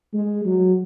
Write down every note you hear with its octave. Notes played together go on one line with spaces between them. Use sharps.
G#3
F#3